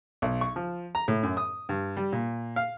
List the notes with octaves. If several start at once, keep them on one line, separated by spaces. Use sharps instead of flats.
B1
C#6
F3
A#5
A2
F#2
D#6
G2
G3
A#2
F5